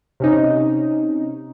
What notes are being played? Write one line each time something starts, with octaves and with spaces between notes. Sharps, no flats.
C3 C#4 D#4